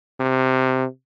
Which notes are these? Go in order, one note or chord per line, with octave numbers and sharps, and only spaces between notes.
C3